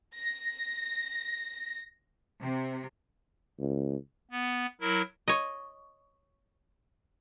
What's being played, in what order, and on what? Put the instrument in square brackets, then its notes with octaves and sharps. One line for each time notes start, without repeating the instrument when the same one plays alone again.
[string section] A#6
C3
[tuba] C#2
[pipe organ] B3
F#3 E4 A#4
[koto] C#5 D#5